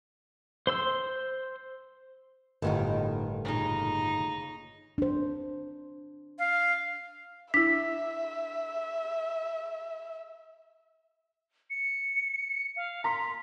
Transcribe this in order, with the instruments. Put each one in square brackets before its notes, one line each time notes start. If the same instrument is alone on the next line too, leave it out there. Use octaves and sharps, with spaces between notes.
[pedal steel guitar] C5 C6 E6
[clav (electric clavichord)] G1 A2 [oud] D#3 B3 D#4
[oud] A#2 C#3 [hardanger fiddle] D#4
[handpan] D4 C5
[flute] F5
[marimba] D4 E4 [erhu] E5 [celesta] B6
[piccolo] C#7
F5
[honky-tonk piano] A#5 C6 [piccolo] B6